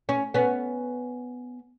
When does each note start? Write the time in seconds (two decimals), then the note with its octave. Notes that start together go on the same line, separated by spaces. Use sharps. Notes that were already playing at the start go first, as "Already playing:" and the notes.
0.09 C#4
0.34 B3 C#4